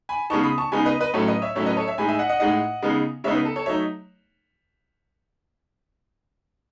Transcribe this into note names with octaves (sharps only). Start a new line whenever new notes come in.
G#5 B5
C#3 G#3 B3 D#4 A5 C#6
B5 D#6
A5 C#6
C#3 G#3 B3 D#4 G#5 B5
B4 D#5
B4 D#5
A2 F#3 A3 C#4 A4 C#5
B4 D#5
C#5 E5
A2 F#3 A3 C#4 C#5 E5
B4 D#5
A4 C#5
C#5 E5
A2 G#3 D#4 G#5 B5
E5 G#5
D#5 F#5
D#5 F#5
A2 G#3 D#4 D#5 F#5
C#3 G#3 B3 D#4
C#3 G#3 B3 D#4 C#5 E5
B4
A4
A4 C#5
F#3 A3 D#4 C#5 E5